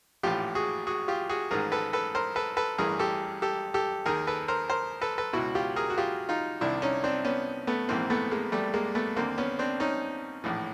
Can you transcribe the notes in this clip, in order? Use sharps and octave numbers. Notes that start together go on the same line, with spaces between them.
A#1 A2 E3 F4 G4
F#4 G#4
F#4 G#4
F4 G4
F#4 G#4
A1 G#2 D#3 G#4 A#4
A4 B4
A4 B4
A#4 C5
A4 B4
A4 B4
A1 G2 E3 G#4 A#4
G4 A4
G4 A4
G4 A4
D#2 D#3 G#4 A#4
A4 B4
A#4 C5
A#4 C5
A4 B4
A4 B4
C#2 B2 E4 F#4
F4 G4
G#4 A#4
F#4
F4 G4
D#4 F4
C2 C3 D#3 D4 E4
C#4 D#4
C4 D4
B3 C#4
A3 B3
A#1 G#2 E3 A#3 C4
A3 B3
G#3 A#3
G3 A3
G#3 A#3
A3 B3
D#2 D3 A#3 C4
B3 C#4
C4 D4
C#4 D#4
A#1 A2 E3